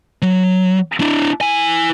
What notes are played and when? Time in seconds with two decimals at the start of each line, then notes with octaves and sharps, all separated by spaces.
0.22 F#3
1.00 D4 E4
1.41 E4 G#5